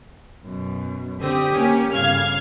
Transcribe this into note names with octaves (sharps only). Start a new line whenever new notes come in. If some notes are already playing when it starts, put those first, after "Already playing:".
F#2 B2
D3 C4 G4 D#6
A#3 C#4
G1 C#3 F5 F6 G#6